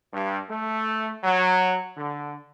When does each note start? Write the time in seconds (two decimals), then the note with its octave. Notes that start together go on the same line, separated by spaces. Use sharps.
0.13 G2
0.49 A3
1.24 F#3
1.96 D3